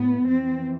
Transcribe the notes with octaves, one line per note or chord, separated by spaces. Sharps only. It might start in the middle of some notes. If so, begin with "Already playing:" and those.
Already playing: A2 B3
F2 E3 C4